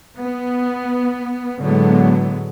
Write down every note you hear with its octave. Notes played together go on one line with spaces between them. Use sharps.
B3
A2 D3 F#3 G#3 B3